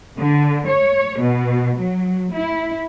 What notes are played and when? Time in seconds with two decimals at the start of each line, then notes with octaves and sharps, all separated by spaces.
0.19 D3
0.68 C#5
1.21 B2
1.79 F#3
2.33 E4